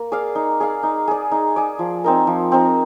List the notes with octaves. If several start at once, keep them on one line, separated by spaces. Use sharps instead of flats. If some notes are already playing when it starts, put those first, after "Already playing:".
Already playing: A#3 A#4
G#4 D5 F5
D#4
G#4 D5 F5
D#4
G#4 D5
D#4
G#4 D5
F3
C4 D#4 A#4
F3
C4 D#4 A#4